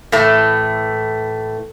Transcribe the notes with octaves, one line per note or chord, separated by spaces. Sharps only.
A2 E3 A3